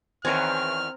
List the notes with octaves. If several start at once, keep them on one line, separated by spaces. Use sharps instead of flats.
E2 D#3 C4 A#4 B4 C#5 G#5 F6